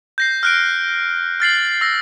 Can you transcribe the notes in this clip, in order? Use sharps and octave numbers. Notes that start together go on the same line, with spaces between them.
G6 A#6 C7
F6 F#6 D7
F6 A6 C7 F#7
E6 A#6